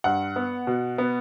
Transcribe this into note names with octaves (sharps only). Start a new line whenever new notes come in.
G2 F#5
B3
B2
B3